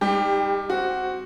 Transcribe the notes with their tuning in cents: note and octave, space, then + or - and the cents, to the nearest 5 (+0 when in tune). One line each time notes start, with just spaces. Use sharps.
G3 +35 D#4 +0 G4 +15
C4 +0 F#4 +0